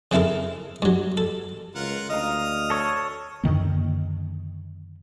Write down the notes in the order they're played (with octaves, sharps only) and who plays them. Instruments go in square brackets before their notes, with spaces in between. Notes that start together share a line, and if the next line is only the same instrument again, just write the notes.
[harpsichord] C#3 C4 E4 A4 A#4
G2 F#3
A4
[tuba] C#2 [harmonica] F4 A#4 F#5
[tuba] D2 [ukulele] D#5 F5 A#5 [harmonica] D#6 F6
[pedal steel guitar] A4 C#5
[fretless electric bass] F#2 D3 D#3 A#3